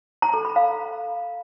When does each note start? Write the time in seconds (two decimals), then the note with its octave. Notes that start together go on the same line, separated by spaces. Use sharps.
0.22 A#5
0.34 A4
0.45 B5
0.56 F5